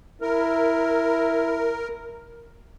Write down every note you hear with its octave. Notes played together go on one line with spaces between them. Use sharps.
E4 A#4